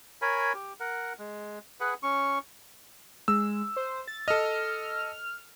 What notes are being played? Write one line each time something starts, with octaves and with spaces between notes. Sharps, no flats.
A#4 C#5 G#5 B5
G4
A#4 F#5
G#3
G#4 B4 F#5
C#4 C#6
G#3 E6
C5
A6
A4 D#5 F6